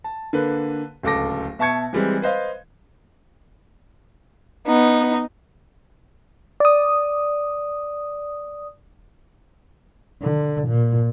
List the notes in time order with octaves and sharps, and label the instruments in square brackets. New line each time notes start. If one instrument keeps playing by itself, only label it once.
[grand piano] A5
D3 A#3 B4
D1 C#2 A4 D6 A#6
B2 E5 A5 C#6 G#6 C#7
E3 G3 G#3 C4
B4 C5 D#5 F5
[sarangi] B3 [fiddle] D#4
[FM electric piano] D5 D#6
[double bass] D3
A#2